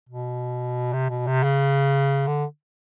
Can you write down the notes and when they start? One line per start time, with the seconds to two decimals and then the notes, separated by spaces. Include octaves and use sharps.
0.09 B2
0.93 C3
1.10 B2
1.27 C3
1.43 C#3
2.27 D3